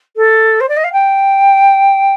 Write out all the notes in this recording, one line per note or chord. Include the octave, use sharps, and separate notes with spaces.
A4
C5
D5
D#5
F5
G5